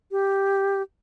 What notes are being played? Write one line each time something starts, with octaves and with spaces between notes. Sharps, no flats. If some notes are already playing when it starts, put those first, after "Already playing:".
G4